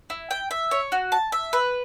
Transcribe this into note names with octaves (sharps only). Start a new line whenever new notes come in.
E4
G5
E5
C#5
F#4
A5
E5
B4